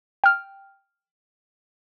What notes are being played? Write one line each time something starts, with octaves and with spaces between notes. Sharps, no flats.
G5 F6